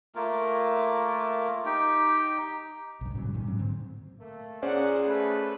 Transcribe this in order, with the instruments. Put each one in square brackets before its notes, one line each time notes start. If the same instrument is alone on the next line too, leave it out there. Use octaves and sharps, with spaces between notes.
[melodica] A3 A#3 F4 A#4
D#4 G4 G5
[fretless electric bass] B1 G2
G2 A#2 C#3 F#3
G2 A#2 D#3 G3
G#2 F#3 C4
A2 D3 C4
[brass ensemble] A3 A#3
[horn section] A#2 F#5 [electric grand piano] C#4 C5 D5 [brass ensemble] G#4
[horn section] A3 B4